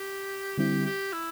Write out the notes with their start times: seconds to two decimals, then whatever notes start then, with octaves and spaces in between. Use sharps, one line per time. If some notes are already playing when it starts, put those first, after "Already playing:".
Already playing: G4
0.58 D3 G3 C4 E4 G4
0.85 G4
1.12 E4